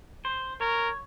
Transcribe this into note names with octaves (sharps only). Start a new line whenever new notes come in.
C5
A#4 C#5